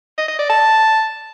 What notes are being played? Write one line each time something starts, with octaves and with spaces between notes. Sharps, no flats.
D#5
D#5
D5
A5